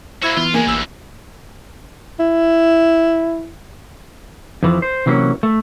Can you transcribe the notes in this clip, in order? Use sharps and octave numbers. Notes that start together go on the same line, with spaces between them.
A#3 E4 F#4 C5 E6 G#6
E3 B3 F4
C#3 G#3 A#3 G#5
A1 D2 E3 E6
E4
F2 E3 F3
C5
C3 E3 F#3 A#3 C#4
A3